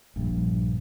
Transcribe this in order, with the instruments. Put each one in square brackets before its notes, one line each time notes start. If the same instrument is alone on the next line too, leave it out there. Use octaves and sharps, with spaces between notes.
[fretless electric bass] A#1 G2